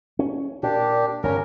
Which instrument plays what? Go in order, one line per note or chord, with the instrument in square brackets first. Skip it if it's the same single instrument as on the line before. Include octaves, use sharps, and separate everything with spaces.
[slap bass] C#4
[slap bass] A#2 [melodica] D4 G4
[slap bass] G1 G2 C#3 [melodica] C#4 A#4